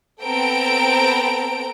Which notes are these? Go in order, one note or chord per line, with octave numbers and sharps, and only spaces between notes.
B3 C4 A4 G5 A#5 D7